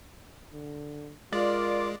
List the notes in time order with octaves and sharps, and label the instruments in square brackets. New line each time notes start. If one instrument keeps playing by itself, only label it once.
[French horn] D3
[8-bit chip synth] G#3 [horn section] F4 [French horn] A#4 [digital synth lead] D5